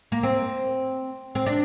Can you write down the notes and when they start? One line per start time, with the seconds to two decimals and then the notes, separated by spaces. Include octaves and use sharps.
0.12 A#3
0.23 C4
1.35 C4
1.46 D4